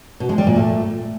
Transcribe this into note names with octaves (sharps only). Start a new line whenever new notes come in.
B2
G#3
G3
A#2
A3